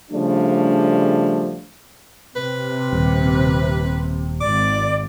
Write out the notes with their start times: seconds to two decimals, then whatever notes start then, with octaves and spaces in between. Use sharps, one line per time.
0.11 C#3 F3 G3 A3 D4
2.36 C3 B4
2.93 D#1
4.41 G#1 D5 D6